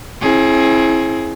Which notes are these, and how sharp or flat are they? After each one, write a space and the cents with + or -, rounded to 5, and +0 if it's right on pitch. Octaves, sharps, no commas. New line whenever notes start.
C4 +45 E4 +0 G#4 +20